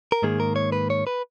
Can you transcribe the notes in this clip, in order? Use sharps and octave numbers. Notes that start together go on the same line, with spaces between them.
A#4
G#2 D#3 A#3 G#4
A#4
C#5
B4
C#5
B4